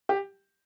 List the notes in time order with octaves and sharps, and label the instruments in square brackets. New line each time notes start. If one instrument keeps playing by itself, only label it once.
[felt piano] G4